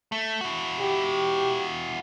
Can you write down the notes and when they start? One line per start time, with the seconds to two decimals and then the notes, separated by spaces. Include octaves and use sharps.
0.12 A3
0.41 E4 F#4
0.80 G4